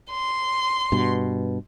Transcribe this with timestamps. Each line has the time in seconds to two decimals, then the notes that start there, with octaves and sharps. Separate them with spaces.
0.11 C6
0.92 G2 B2